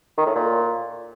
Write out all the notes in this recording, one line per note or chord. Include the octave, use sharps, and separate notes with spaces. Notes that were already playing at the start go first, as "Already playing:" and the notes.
D#3
A2
A#2